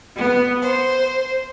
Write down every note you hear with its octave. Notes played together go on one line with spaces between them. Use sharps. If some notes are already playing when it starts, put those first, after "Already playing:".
B3
C5